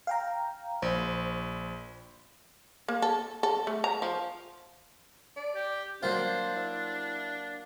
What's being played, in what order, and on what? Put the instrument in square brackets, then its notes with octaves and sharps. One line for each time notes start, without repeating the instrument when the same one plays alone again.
[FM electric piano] F5 G5 A#5
[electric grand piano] A#1 [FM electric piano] C5
[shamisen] A#3
A4
A4
A3
A#5
F3
[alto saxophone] D5
[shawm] G4
[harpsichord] F#3 A#3 F4 [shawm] D4 [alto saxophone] C5
[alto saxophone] E4